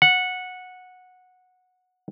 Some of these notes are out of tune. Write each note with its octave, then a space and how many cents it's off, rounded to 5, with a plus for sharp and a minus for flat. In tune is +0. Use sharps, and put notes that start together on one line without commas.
F#5 -10